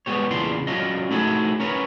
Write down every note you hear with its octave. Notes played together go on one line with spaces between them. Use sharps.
G3 G#3 B3 G4 C#5
E2 A#2 C#3 D4 C6
F#3 C#4 D4 F4 D#5
A3 D#4 E4 F#4 G#4
C#4 A#4 B4 C#5